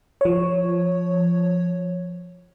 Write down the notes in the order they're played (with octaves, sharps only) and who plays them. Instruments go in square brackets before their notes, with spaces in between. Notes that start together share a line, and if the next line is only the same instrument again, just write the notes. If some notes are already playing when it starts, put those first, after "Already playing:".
[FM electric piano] F3 C#5